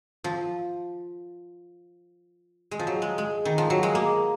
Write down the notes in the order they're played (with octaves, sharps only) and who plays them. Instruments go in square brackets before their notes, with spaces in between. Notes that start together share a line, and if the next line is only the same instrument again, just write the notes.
[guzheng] F3
G#3
F3
F#3
G#3
G#3
D#3
F3
F#3
G#3
A#3